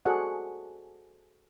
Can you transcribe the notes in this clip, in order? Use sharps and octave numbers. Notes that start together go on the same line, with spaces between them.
F#4 G#4 A4 C5 D5 F#5